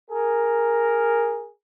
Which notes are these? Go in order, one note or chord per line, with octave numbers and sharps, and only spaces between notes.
G#4 A#4